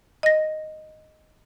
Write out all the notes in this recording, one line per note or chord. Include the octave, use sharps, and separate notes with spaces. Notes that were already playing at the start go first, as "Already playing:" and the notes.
D#5 A#6